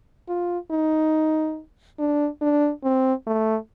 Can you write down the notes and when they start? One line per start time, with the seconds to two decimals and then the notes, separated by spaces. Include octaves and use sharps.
0.29 F4
0.71 D#4
1.99 D4
2.41 D4
2.84 C4
3.27 A3